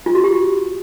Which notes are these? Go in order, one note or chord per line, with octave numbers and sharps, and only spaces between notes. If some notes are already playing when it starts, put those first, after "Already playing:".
F4
F#4
G4